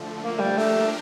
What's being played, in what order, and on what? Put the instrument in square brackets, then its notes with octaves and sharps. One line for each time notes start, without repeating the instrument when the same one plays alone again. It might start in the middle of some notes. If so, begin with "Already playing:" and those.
Already playing: [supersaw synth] D3 F3 A3
[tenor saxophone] A#3
G3
[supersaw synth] F3 A#3 D4 G4 A#4 [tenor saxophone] A3